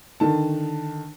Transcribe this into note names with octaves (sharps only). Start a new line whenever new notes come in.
D3 D#3 A5